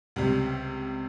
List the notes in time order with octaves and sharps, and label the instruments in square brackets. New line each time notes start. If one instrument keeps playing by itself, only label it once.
[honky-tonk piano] C#2 C3 G3